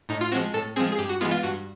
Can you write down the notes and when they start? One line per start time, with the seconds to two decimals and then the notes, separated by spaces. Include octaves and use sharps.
0.09 A2 D#4
0.21 F4
0.32 F3 G#3 C4 F#4
0.54 A2 A4
0.76 F3 G#3 C4 G#4
0.92 G#4
0.98 G2 G4
1.09 F#4
1.21 E3 G#3 B3 F4
1.31 F4
1.43 G2 F#4